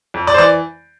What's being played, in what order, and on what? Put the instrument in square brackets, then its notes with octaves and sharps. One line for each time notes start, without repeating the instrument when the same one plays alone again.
[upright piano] F2
D5
C5
E3 D5